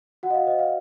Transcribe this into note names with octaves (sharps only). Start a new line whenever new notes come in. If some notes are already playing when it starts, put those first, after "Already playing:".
F#4 F#5
D#5
F5
C5 D#5
F5